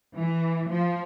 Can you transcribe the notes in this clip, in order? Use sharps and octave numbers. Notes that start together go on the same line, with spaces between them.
E3
F3